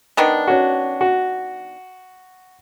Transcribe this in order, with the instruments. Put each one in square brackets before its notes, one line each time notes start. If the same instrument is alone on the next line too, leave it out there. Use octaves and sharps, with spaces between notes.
[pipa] D#3 B3 D4
[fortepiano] C#4 F#4
F#4